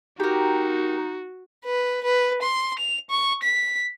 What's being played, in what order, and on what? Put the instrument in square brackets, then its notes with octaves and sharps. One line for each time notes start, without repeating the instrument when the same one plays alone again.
[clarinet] D#4 [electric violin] F#4 [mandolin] G4 A#4
[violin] B4
B4
C6
F7
C#6
B6